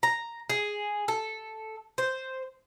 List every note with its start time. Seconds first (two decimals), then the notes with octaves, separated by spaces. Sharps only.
0.03 A#5
0.50 G#4
1.08 A4
1.98 C5